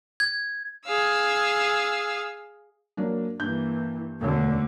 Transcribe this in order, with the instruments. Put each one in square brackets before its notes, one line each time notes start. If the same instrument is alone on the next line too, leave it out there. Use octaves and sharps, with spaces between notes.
[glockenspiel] G#6
[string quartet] G#4 F5 E6
[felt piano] F#3 A#3 D4
[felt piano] G2 G6 [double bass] E3 A#3
[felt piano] E1 C#5 [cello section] D2 [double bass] D3